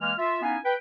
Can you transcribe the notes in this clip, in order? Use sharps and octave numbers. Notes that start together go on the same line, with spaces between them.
E3 G#3 A#3 F6
F4 E5
B3 C#4 D#4 E4 F5 G#5
B4 G5